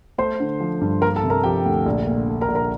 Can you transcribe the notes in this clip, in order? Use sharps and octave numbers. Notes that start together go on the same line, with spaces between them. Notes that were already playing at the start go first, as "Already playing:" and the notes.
A3 C5 C6
D3
F3
G2
A#3 A#4 A#5
A4 A5
C3
A#4 A#5
F3 G4 G5
D2
A#1
A#2
A3
A#4 A#5
A#1
A#4 A#5